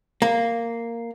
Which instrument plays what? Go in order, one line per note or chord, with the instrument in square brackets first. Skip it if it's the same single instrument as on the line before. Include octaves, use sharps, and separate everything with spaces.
[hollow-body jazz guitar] A#3